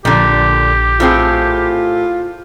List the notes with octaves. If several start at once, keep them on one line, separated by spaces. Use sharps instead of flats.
A#1 A#2 D3 G4
A2 C4 F4 G#4